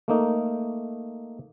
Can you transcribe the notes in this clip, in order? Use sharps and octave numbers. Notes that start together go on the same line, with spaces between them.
A3 A#3 D#4